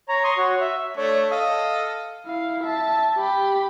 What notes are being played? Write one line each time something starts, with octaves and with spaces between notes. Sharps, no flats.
C#5 A#5
C6 C#6 D#6
F#4 C#5
E5
A3 D4 C#5
A4 D#5 F5
E4 F5
E5 A5
G4 B5